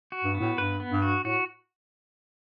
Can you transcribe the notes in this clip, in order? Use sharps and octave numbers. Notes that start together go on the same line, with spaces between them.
F#4
G2
B3
A2
G2 B4
B3
G2
F#4
A2 F#4